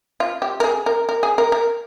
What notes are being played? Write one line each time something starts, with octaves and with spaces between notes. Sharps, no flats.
F4
G4
A#4
G#4
A#4
A#4
G#4
A#4
A#4